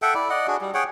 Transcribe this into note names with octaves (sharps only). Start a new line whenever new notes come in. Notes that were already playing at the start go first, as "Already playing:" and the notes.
A4 E5 F#5 G5
E4 D5
D5 D#5 F#5
D4 F#4 G#4
G3
G#4 C#5 F#5 G5